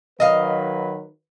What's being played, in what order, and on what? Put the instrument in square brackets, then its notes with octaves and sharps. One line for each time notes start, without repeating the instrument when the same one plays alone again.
[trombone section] D#3 F#3 B4 [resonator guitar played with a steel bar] D#5 F5